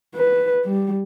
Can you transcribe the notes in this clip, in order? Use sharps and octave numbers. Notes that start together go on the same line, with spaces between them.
B4
G3